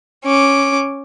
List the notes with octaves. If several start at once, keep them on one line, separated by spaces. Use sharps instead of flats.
C#4 D6